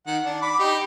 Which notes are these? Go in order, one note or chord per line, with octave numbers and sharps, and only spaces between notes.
D#3 F#5
D4
B5 D6
D#4 G4